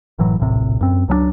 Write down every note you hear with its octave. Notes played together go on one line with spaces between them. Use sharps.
F#1 A2 E3 F#3
D1 A#1 A2 C3
F#2 C4
C#2 F#3 G3 D4